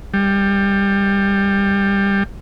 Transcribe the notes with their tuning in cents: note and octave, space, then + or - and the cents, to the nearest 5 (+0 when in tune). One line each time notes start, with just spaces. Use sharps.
G3 +15